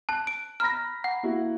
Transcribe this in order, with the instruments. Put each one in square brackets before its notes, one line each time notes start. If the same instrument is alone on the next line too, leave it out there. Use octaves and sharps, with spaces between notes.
[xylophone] A5 [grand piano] F#6
[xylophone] D7
[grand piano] A#5 B5 A#6 [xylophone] F6
[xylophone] F#5
[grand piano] A#3 E4 F#4